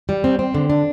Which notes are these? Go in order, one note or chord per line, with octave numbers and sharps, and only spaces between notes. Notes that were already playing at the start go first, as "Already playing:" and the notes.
G3
C4
C4
D3
D4